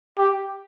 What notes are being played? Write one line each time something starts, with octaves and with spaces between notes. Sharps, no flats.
G4